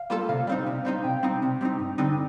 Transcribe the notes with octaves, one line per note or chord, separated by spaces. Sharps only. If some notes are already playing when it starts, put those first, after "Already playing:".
Already playing: F5
G3 A#3 F4 A4
C3 F5
G3 C4 D#4
C3
G3 C4 D#4
C3 G5
G3 C4 D#4
C3
G3 C4 D#4
G2
D3 G3 C4 D#4